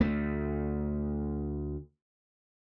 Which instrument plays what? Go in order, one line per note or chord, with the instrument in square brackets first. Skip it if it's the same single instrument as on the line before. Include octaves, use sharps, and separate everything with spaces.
[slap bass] D2 A3